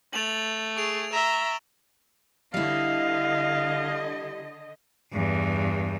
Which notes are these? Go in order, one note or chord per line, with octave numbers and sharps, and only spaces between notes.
A3 A6 F7 F#7
G#4 C#6 D7 F7
E5 A#5 E7 G7
D3 G3 E4 D#5 F5
E2 G2